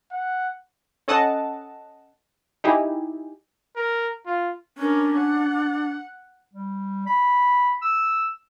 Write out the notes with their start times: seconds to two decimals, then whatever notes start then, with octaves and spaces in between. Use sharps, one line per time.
0.12 F#5
1.08 C#4 A4 D#5 F#5 A5
2.64 D#4 E4 G4 G#4
3.76 A#4
4.26 F4
4.78 C#4 D4 A#4
5.17 F#5
6.53 G3
7.07 B5
7.82 E6